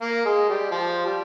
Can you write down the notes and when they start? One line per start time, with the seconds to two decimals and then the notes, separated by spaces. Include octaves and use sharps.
0.02 A#3
0.25 G#3
0.49 G3
0.71 F3
1.06 G3